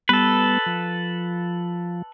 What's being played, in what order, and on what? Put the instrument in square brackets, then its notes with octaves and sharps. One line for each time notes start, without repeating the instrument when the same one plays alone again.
[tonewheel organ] G3 B3 [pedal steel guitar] A4 B4
[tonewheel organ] F3